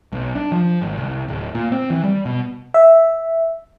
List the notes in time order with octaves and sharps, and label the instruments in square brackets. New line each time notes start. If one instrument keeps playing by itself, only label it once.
[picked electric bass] B1
D4
F3
G#1
C2
D1
A#2
C4
E3
G3
B2
[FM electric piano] E5